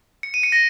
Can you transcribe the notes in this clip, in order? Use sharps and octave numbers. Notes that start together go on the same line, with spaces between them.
C#7
D#7
C#7
A#6